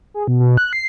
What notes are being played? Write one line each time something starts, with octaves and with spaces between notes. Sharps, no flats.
G#4
B2
B2
F#6
C7